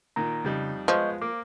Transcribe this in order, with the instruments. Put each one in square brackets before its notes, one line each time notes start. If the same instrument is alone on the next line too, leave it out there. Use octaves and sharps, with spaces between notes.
[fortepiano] A#2 D#3 [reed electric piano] A#5
[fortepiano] F2 G3 D#4 [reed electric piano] C#3
[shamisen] F3 [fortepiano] G#3 B3 F6 [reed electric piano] D#5 C#6 G6
[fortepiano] A#3 [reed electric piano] D6